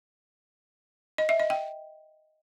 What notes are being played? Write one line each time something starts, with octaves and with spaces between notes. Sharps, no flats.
D#5
E5
D#5
G5